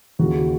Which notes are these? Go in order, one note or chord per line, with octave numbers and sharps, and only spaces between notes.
D#2 C#3 E3 F#4
F#4